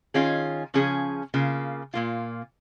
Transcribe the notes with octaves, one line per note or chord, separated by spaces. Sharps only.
D#3 C#4 F4 G#4
C#3 F3 C#4 G#4
C#3 A#3 F4
A#2 A#3 F4